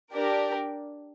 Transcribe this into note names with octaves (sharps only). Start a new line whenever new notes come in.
D4 G4 A#4 D5